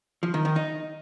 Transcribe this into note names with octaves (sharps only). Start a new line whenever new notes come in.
F3
D#3
D#3
D#4